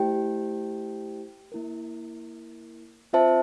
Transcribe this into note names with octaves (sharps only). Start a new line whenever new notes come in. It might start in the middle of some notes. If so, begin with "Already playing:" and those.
Already playing: A3 E4 G4 C5 G5
A#3 E4 A#4
C4 F4 C5 E5 A5